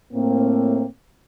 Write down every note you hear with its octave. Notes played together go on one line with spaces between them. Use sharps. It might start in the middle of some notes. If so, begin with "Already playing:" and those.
A2 A#3 C4